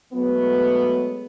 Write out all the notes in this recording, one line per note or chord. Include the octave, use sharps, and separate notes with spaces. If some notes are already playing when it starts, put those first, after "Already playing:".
F#3 G#3 A3 B3